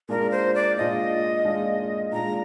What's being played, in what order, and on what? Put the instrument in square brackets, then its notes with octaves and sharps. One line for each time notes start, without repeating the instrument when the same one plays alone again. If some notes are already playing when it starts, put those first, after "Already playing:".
[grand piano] A#2 G#3 D4 F4 [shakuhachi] A#4
[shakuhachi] C5
D5
[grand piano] A#2 G#3 D4 F4 [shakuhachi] D#5
[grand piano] A#2 G#3 D4 F4
[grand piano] A#2 G#3 D4 F4 [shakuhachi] A#5